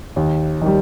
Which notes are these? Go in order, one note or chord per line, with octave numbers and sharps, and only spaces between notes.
D#2
D#3 G3